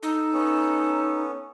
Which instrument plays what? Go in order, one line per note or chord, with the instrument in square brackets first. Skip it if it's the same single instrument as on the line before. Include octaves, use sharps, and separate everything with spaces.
[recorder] D#4 [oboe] A4
[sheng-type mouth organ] B3 C#4